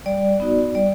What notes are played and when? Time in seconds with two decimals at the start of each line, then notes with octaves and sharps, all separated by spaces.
0.06 G3 D5
0.40 B3 D#4 F#4
0.75 G3 D5